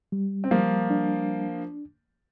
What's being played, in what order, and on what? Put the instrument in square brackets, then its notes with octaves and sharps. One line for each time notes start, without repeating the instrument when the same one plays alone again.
[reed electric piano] G3
[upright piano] C4
[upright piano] F3 A#3 [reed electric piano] G3
[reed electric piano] D4